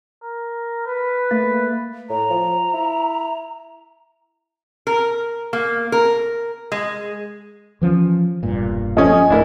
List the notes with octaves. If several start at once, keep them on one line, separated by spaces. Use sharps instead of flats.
A#4
B4
A3 A#3 A6
A2 A#5
F3
E4
A#4
A#3
A#4
G#3
E3 F3 C#4
E1 G2 A#2
F3 A3 C#4 D#5 G#5
D1 A3 D4 E4 A#4